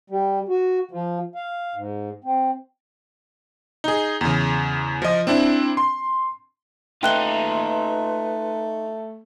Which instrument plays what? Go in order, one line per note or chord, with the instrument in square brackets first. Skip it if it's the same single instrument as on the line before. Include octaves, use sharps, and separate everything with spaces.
[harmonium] G3
F#4
F3
F5
G#2
C4
[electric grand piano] D#4 G#4
E2 C#3
F3 D#5
C4 D4 E4
C6
[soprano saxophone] A3 [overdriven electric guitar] D#4 F4 [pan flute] B4 [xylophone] G5 F#6 G7